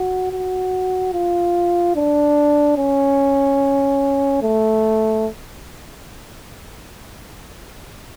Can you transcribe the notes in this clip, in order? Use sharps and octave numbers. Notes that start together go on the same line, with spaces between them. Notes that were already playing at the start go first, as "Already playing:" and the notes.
Already playing: F#4
F#4
F4
D4
C#4
A3